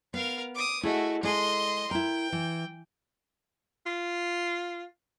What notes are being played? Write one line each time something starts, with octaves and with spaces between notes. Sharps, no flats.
B3 A#4 F5
D6 D#6
A3 E4 F#4 G#4 D#5
G#3 G#4 A4 D#5 C6
E4 A#4 G5
E3
F4